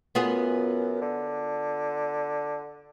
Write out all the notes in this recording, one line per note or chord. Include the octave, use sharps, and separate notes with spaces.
F#2 B3 F4 G#4
D3